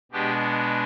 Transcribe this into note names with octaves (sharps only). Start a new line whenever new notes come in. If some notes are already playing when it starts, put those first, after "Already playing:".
B2 G#3 B3 D4 G4